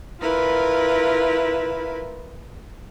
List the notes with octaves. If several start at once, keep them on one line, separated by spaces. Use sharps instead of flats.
E4 F4 A#4 B4